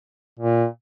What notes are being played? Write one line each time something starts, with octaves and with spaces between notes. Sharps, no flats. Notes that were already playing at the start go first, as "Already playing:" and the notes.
A#2